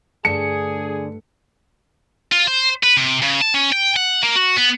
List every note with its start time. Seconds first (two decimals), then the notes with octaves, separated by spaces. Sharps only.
0.25 G2 D3 A3 G#4 D5 A5 C#7
2.32 F4
2.47 C5
2.83 B4
2.97 C3
3.22 C#3
3.41 A5
3.54 C#4
3.72 G5
3.96 F#5
4.23 A#3
4.36 F#4
4.57 B3